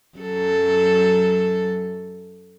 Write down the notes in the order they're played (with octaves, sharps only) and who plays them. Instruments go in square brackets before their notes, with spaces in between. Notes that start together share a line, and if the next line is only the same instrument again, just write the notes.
[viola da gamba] F#2 F#3 A4